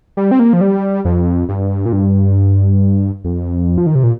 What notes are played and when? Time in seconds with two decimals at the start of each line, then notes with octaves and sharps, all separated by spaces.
0.17 G3
0.31 C4
0.39 A#3
0.53 F3
0.61 G3
1.05 F2
1.49 G2
1.86 A#2
1.93 G2
3.24 F2
3.78 F3
3.86 D#3
3.95 C3
4.04 A#2